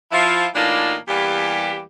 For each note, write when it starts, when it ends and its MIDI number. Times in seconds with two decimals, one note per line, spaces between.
0.12 0.46 53
0.12 0.46 64
0.12 0.46 65
0.54 0.96 45
0.54 0.96 52
0.54 0.96 58
0.54 0.96 62
0.54 0.96 63
0.54 0.96 65
1.08 1.81 40
1.08 1.81 52
1.08 1.81 55
1.08 1.81 58
1.08 1.81 67